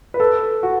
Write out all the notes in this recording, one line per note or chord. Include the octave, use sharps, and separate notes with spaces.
B4
A4
F#4